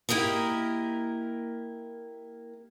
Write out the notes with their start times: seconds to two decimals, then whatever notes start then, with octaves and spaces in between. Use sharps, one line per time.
0.09 A#3 E4 G4 A#4 D#5